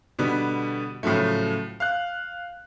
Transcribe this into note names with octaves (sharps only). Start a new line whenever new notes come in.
B2 D3 G3 B3
A2 C#3 F3 F#3 A3
F5 F#6